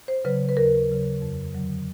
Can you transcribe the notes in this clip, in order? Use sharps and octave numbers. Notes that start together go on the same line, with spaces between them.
C5
C#3 F#3 B4
B4
D#2 A#4
C#3 F#3
F2
D3 F#3